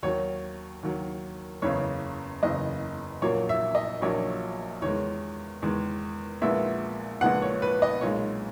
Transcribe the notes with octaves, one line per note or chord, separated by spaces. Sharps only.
D#2 D#3 F#3 C#5
D#2 D#3 F#3
F#1 E2 C#3 C#5
F#1 E2 C#3 D#5
A#1 A#2 F#3 A#3 C#5
E5
D#5
A#1 A#2 F#3 A#3 C#5
E2 D#3 G#3 C#5
E2 D#3 G#3
A#1 A#2 G#3 B3 E5
A#1 A#2 G#3 B3 F#5
C#5
B4
D#5
B1 A#2 G#3 C#5